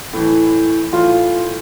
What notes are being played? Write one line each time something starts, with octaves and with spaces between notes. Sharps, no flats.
A2 E3
A2 E3 F4